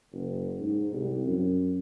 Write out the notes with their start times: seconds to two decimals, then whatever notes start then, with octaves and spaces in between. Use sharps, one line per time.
0.13 F#1
0.61 G#2
0.93 C2
1.27 F#2